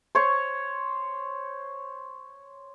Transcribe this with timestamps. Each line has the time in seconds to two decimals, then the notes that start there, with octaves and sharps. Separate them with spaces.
0.15 C5 C#5 C#6